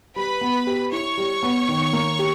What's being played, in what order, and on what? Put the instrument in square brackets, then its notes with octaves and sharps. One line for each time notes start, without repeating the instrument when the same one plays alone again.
[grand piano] G3 [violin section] B4 B5
[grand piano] B3
G4
[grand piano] E4 [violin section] C#5 C#6
[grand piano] G3
B3
D#3
A#3
G4